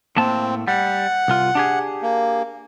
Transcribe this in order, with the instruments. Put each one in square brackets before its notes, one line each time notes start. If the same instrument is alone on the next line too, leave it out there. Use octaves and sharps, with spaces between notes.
[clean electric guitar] A2 A#3 A5 [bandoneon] C4
[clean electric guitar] G3 [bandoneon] F#5
[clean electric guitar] C2 F4
D4 G4 G#4
[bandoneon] A#3